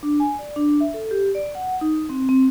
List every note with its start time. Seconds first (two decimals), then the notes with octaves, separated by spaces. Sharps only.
0.03 D4
0.20 G#5
0.39 D5
0.56 D4
0.80 E5
0.94 A4
1.11 G4
1.35 D5
1.55 F#5
1.81 D#4
2.09 C4
2.29 C4